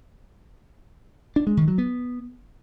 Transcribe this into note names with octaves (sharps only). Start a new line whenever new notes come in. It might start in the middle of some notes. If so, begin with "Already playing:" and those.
D4
G#3
D#3
F#3
B3